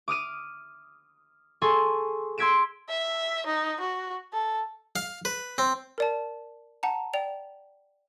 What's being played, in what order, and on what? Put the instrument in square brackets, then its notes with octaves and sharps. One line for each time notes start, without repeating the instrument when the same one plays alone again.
[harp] D6 D#6 F6 D#7
G#4 A4 G#5 C6 C#6
C6 E6 G#6 B6 D7 E7
[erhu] E5
D#4
F#4
A4
[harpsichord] F5
B4
C4
[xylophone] A#4 D5 A5
F#5 A5 A#5
D5 G5 F7